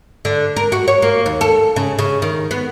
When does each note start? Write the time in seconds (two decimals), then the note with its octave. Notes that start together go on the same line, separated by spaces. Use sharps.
0.25 D3
0.56 A#4
0.72 F#4
0.88 C#5
1.02 A#3
1.26 D#2
1.41 A4
1.76 C#3
1.99 C#3
2.22 D#3
2.51 B3